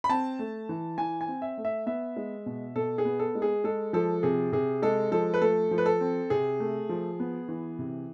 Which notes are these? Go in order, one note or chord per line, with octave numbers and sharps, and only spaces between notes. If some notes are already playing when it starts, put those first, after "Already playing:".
B5
C4 A5
A3
E3
E3 G#5
G#5
C4
E5
A3
E5
B3 E5
G#3
B2
B2 A4
G#4
B3
A4
G#3
G#4
G#3 A4
F3 A4
C3 G#4
C3 G#4
G#3 A4
F3 A4
B4
A3 A4
F3
B4
A4
C4
C3 G#4
A3
F3
B3
E3
C3